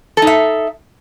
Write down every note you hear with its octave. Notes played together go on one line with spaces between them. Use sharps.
D#4 A4 E5